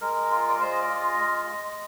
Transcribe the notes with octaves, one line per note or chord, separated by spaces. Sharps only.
G#3 A#4
F4
D5
G#3 C5
D#5
D5
F4
D#5
G#3
G#3